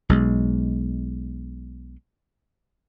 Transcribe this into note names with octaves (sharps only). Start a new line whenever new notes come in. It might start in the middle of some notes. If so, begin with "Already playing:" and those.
B1 G#3